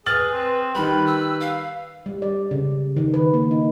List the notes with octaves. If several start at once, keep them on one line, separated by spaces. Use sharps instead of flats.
G#4 B4 F6 A6 F#7
C4
D#3 G3 B4 B5
E6
F5
G3
D5
C#3
D#3
B4
A#3
D#4